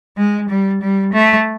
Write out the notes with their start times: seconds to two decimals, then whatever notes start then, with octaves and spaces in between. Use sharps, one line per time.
0.17 G#3
0.49 G3
0.81 G3
1.13 A3